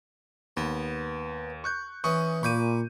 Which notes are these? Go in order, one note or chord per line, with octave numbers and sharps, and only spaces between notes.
D#2 B3
C#6 F#6 G6
E3 C#4 C#6 D#6
A#2 B5 C#6 D6 G6 D#7